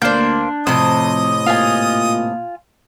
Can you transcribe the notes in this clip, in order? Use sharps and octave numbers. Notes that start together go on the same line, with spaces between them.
D2 A#3 D4 C5 G6
F2 A2 C3 C5 D#5 D#6
A#2 F4 G#5